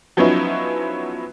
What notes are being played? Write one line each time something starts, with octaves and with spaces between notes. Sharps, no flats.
F3 F#3 B3 C#4 D#4 E4